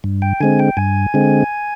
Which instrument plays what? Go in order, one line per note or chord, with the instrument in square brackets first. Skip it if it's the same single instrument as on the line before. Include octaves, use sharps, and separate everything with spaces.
[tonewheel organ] G2
G5
D3 G#3 C4 G#5
G5
G2 G#5
D3 G#3 C4